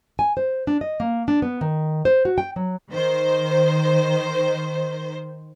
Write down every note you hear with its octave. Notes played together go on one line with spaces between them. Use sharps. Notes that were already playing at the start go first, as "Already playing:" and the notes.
G#5
C5
D4
D#5
A#3
D4
B3
D#3
C5
F#4
G5
F#3
D#3 C5